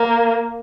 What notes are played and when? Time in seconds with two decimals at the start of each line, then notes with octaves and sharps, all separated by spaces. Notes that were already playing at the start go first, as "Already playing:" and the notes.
Already playing: A#3